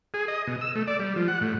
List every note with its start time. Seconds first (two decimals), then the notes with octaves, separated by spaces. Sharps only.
0.14 G#4
0.28 D#5
0.47 B2
0.61 E6
0.75 A3
0.87 D5
1.00 G3
1.16 F3
1.28 F#5
1.41 A2